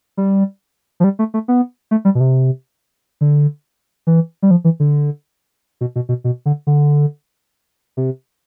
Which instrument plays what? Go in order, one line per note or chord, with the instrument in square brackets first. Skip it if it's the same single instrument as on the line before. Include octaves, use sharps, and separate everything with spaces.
[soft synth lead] G3
F3
G3
A3
A3
B3
A3
G3
B2
C3
D3
E3
G3
F3
E3
D3
B2
B2
B2
B2
D3
D3
C3